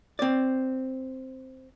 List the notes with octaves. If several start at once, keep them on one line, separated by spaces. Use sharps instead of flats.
C4 D5